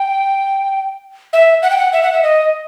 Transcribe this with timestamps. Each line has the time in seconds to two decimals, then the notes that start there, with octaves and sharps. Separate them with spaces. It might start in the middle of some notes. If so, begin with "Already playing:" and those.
Already playing: G5
1.33 E5
1.62 F#5
1.70 G5
1.78 F#5
1.93 E5
2.03 F#5
2.13 E5
2.23 D#5